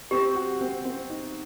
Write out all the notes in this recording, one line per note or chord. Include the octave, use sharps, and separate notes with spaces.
C4 G4
F#4
C4
C4
D#4